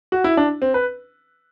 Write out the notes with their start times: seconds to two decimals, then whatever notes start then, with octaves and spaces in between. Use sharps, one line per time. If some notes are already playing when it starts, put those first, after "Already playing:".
0.12 F#4
0.24 E4
0.37 D4
0.62 C4
0.74 B4